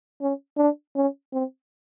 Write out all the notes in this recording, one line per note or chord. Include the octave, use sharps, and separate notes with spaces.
C#4
D4
C#4
C4